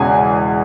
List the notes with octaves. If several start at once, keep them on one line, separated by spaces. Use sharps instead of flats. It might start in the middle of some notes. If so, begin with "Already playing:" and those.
Already playing: E1 E2 C#3 E3 G#5